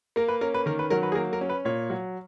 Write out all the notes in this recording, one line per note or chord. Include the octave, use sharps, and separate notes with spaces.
A#3 A#4
B4
C#4 A#4
B4
D#3 A#4
B4
F#3 A#4
B4
G#4
A#3 A#4
A#4
C#4
B4
A#2 C#5
F#3